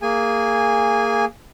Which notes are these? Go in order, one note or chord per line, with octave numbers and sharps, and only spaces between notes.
A#3 G#4 G#5